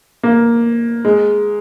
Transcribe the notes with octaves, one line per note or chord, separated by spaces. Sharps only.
A#3
G#3